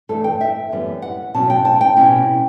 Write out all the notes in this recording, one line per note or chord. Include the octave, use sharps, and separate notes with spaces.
G2 E3 A3 D4 A4
G5
E5
F#2 E3 G3 B3
F#5
E2 B2 F#3 C#4 A5
G5
A5
G5
B2 G3 C#4 E4